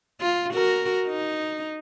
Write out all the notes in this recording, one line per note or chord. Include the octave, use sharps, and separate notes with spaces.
F4
F#4 A#4
D#4